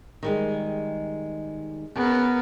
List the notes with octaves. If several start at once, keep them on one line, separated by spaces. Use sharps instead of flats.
D#3 G3 G#3
C#3 B3 A#4